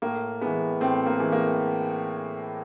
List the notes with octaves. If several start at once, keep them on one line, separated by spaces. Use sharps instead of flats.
A2 A#3
E3 G#3 B3
A2 C4
A#3
E3 G#3
A#3